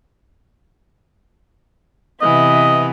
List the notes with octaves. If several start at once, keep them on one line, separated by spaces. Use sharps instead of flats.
C3 E3 B3 D#5